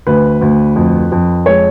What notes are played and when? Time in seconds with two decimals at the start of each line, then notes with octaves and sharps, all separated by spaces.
0.07 D2 B4
0.41 D2
0.76 F2
1.12 F2
1.46 G#3 C#5